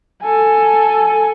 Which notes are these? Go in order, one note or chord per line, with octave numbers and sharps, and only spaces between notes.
A4 G#5